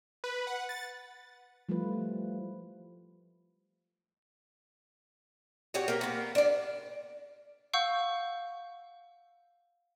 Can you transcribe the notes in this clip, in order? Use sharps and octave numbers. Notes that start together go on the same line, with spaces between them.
B4
F#5
A6
F3 G3 A3 E4 F4 B4
F#4 G4 C#5
A#3 G4
A#3 B3
D4 D5
F5 F#5 C#6 E6 G6